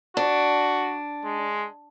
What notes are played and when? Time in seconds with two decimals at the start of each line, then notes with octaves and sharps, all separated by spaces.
0.17 D4 F#4
1.25 G#3